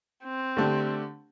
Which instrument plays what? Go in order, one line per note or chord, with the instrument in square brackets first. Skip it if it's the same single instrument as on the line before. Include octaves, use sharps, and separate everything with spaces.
[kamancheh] C4
[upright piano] D3 A3 D4 G4